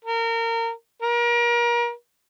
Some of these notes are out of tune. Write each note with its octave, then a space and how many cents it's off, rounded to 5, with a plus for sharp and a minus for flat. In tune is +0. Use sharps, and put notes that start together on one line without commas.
A#4 -25
A#4 +35